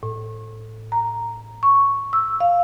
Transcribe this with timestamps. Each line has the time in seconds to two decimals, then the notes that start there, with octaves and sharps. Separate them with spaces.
0.03 A2
0.92 A#5
1.63 C#6
2.13 E6
2.40 F5